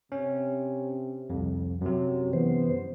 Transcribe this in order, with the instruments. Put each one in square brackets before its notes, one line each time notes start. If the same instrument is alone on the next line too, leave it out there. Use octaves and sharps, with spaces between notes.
[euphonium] C3 [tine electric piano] C#4
[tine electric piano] C2 F2
[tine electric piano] F#2 C3 [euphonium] F#3
[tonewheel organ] E3 C5 [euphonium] B3